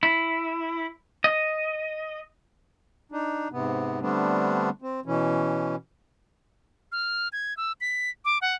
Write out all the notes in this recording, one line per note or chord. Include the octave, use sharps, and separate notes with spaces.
E4
D#5
D4 D#4
G#2 C3 B3
D3 G3 A3 B3 C4 D4
C4
B2 E3 C#4
F6
G#6
E6
B6
D6
F#5